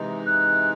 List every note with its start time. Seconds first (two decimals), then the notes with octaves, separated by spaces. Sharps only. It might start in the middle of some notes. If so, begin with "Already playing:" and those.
Already playing: C3 E3 G#3 D#4
0.27 F#6